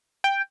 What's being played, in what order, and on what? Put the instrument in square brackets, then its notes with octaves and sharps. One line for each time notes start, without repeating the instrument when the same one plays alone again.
[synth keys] G5